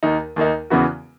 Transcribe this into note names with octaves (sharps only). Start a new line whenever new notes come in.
D#2 D#3 A#3 D#4
D#2 D#3 A#3 D#4
E2 C#3 E3 B3 F#4